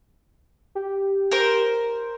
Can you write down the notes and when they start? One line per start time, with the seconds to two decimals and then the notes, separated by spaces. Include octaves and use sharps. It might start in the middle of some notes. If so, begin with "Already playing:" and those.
0.75 G4
1.31 A#4 C5